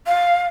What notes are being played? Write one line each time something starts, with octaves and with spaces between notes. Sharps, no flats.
F5